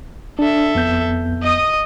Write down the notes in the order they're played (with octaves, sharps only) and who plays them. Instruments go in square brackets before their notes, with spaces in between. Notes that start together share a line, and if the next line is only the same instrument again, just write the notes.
[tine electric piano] D4 [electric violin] A4 E5
[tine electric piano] F2 B3 G6
[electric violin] D#5 D#6